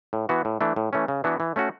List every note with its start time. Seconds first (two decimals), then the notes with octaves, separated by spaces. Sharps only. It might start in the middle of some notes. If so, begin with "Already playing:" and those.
0.13 A2
0.29 E3 B3 F#4
0.45 A2
0.61 E3 A3 D4
0.76 A2
0.93 E3 A3 C#4
1.08 C#3
1.24 E3 B3 D4 F#4
1.40 E3
1.56 A3 C#4 F#4